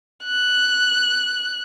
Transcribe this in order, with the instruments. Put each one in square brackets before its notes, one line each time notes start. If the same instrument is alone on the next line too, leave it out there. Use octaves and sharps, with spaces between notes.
[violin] F#6